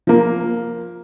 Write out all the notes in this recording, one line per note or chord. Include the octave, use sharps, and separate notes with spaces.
F3 A#3